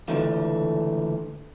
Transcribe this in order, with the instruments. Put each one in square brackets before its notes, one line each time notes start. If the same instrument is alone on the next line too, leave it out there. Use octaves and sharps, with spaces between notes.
[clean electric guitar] C#2 D3 E3 A3 F4